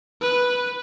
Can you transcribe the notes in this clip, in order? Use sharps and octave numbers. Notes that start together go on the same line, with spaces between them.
B4